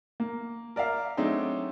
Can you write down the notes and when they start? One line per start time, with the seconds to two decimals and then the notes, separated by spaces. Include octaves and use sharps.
0.20 A#3
0.76 A#4 D5 E5 F5
1.17 F#3 A3 C4 D4 D#4 G#4